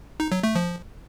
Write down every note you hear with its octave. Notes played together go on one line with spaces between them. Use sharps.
D#4
F#3
A3
F3